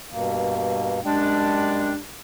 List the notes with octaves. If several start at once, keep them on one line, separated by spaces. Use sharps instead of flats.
G2 B2 A#3
F#2 G3 G#3 D4 G5